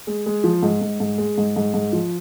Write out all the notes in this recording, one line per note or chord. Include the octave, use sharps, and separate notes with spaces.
G#3
G#3
F3
G#2
G#2
G#2
G#3
G#2
G#2
G#2
F3